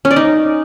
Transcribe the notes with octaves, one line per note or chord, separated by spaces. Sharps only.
C#4
D5
D#4